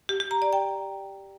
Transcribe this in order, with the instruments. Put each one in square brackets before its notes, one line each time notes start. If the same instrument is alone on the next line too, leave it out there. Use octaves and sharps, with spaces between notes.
[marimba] G4
G4
A#5
D5
G5